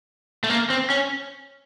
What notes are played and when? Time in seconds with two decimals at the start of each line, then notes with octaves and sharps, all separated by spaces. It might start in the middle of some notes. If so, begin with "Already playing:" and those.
0.44 A3
0.50 A#3
0.70 C4
0.90 C#4